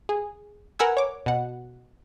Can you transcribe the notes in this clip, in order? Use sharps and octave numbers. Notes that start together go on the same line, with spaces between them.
G#4
A#4 B4 F#5 G#5 E6 G#6
C#5 D6
B2 F#5